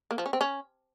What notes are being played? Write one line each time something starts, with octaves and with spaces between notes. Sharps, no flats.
A#3
F3
C#4
C4
C#4